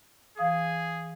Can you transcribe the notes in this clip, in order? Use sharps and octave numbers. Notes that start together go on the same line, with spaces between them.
E3 G#4 F5 D#6